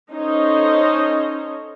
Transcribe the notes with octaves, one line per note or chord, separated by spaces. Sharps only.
C#4 D#4 A4 C5 C#5 D#5